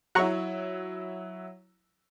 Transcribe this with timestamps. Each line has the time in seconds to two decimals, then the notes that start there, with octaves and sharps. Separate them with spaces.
0.15 F#3 E4 F#5 A#5 C#6